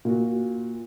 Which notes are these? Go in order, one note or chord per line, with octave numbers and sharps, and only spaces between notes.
A#2 F#4